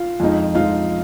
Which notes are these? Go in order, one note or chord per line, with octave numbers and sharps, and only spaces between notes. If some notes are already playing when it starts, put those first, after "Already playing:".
Already playing: F4
F2 F3 G#3 D#4
F2 F3 G#3 D#4 F4